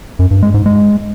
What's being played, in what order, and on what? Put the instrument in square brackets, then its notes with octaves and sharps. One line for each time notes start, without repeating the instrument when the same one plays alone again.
[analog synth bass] F#2
G2
G#3
G#2
G#3